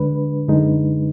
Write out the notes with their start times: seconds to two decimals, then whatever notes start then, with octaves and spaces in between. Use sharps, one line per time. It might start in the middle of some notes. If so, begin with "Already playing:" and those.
Already playing: D2 D3 G#3 D4 B4
0.48 F#2 D3 G#3 D#4